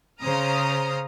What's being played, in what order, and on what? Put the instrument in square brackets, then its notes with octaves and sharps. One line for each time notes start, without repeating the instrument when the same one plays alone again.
[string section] C#3 C5 A#5 D#6 F6